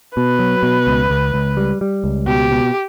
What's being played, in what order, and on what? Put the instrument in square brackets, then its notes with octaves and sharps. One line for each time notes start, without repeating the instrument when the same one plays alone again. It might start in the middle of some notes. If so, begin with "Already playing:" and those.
[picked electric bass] B2 [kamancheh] B4
[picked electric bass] F#3
B2
C#2
C#2
C#2
G3
G3
C#2
[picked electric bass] B2 [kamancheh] G4
[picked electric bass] B2